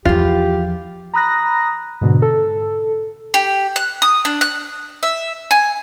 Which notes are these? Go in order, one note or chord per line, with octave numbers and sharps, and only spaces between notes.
E2 F3 F4 G4
A#5 B5 D#6 F#6 A#6
G#2 B2 D3
A4
G4
F#6
D#6
D4
F#6
E5
G#5